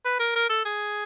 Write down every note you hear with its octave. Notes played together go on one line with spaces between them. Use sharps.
B4
A#4
A#4
A4
G#4